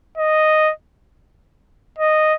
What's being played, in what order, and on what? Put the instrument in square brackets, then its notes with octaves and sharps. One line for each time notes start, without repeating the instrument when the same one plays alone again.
[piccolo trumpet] D#5
D#5